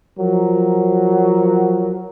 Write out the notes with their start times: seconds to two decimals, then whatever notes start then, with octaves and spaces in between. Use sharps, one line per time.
0.19 F3 F#3 A#4